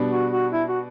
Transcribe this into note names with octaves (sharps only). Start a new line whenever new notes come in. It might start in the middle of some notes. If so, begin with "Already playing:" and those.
Already playing: B2 G3 B3 D4
F#4
F#4
E4
F#4